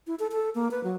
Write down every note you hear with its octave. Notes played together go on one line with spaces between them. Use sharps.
E4
A4
A4
A#3
B4
F#3